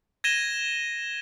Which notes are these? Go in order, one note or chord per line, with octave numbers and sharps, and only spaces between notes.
G#6 A#6 D#7 E7 G7